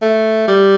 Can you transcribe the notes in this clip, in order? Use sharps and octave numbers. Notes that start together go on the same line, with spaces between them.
A3
G3